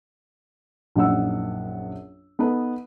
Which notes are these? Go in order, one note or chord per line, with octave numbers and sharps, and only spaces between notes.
A#1 F#2 D#4 F#5 E6
B3 D#4 A4 B4